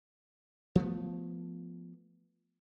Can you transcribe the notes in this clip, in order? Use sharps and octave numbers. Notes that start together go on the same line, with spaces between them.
F3 A3 B3